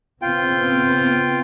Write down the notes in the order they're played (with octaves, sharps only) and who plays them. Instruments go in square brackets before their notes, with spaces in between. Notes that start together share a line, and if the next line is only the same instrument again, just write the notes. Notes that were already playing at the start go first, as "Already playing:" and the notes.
[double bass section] C#3 B3 C4 [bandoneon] F4 G5